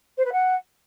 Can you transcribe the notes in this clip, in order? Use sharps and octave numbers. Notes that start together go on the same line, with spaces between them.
C5
B4
F#5